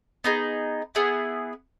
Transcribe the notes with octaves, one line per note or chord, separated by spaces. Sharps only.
B3 D#4 G#4
B3 E4 G#4